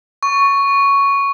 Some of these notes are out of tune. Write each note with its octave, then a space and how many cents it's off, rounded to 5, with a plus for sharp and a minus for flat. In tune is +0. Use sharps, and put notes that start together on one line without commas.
C#6 +5